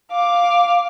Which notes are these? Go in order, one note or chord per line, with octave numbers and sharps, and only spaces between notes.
F5 D6